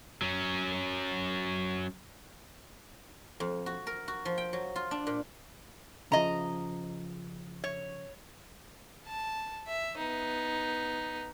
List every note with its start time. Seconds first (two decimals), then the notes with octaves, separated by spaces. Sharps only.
0.22 F#3 C#4
3.40 F2
3.66 F#4
3.87 A#4
4.08 F#4
4.25 F3
4.38 G5
4.53 F#3
4.76 F4
4.91 D4
5.07 A#2
6.12 C#3 F3 D#5 A#5
7.64 C#5
9.07 A5
9.67 E5
9.97 B3 D#4